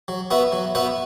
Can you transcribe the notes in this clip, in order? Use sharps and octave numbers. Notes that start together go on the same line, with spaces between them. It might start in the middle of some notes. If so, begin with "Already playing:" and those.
F#3
B3 F#4 B4 E5
F#3
B3 F#4 B4 E5